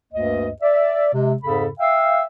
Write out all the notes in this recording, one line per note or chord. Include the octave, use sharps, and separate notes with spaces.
D2 G2 A#3 D#5
D5 E5
C3 G#3
F2 G#2 C#3 A4 B5
E5 F5 G5